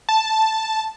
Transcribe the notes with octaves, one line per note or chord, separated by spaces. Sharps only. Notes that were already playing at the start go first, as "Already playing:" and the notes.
A5